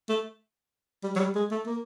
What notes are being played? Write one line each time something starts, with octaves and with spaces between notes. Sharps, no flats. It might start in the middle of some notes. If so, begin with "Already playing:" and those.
A3
G3
F#3
G3
G#3
A3
A#3